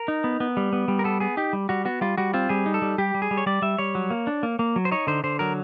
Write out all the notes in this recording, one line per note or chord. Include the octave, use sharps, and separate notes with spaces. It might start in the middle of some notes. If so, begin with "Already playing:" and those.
Already playing: A#4
D#4
B3
B3
G3
B3
G3
A#4
B3 A4
B3 G#4
D#4 G4
G3
G3 F#4
B3 F#4
G3 F4
G3 F#4
C4 F4
G3 G#4
D#4
A4
G3
G3 G4
G3
G#4
G3
C#5
G3 D5
G3 E5
G3 C#5
F#3
A#3
D4
A#3
A#3
F#3
C5
D#4 C#5
D3 C5
D3 C5
F#3 A#4